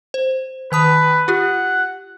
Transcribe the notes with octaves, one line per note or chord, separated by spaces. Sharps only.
C5
D#3 B4 A5 D#6
F4 G4 F#5